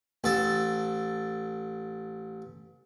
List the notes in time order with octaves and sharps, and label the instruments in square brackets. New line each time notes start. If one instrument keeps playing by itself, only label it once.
[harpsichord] A1 A4